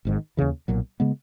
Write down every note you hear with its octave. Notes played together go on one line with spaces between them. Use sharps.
G#1 G#2 D#3
D#2 C#3 E3
B1 A#2 F#3
C#3 G#3 B3